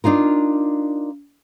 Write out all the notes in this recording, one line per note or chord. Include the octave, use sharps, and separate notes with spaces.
D4 D#4 F4 A#4